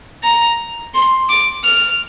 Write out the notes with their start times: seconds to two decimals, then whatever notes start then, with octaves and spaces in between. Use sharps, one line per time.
0.23 A#5
0.94 C6
1.29 D6
1.65 F6